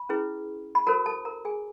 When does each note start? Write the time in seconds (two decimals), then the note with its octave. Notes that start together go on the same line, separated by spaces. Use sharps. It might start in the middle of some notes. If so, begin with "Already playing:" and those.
Already playing: B5
0.09 C#4 E4 G#4 B4
0.75 B5
0.87 F#4 A4 A#4 C5 A#5
1.06 A4 A5
1.25 A#4 A#5
1.45 G#4 G#5